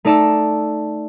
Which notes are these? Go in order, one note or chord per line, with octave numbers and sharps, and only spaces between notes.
A3 D#4 D5 A5 E6